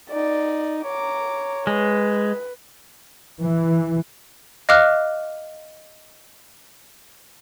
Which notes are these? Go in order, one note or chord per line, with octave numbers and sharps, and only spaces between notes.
D#4 D5
C#5 A#5 D6
G#3 B4
E3
D#5 F5 D6 F6 F#6